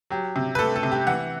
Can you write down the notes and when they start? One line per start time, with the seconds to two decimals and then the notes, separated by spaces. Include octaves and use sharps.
0.10 F#3 G4
0.36 C3
0.55 B4
0.59 A3 A4
0.76 A4
0.83 C3
0.92 G4
1.07 E3 F#5